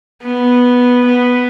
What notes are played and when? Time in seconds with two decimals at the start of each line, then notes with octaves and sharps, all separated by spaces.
0.23 B3
1.07 B3